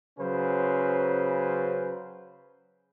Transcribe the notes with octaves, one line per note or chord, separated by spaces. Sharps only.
C#3 F#3 C#4 B4 C5